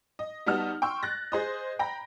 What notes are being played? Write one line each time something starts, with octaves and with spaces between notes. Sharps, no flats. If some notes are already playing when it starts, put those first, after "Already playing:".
D#5
G3 B3 D#4 F#4 A5 F6
G5 C6 C#6 E6
F#6 A6 A#6
G#4 C5 D#5
G5 A#5 B5 A#6